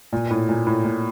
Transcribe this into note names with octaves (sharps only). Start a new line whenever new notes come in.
A#2
A2
A#2
A2
A#2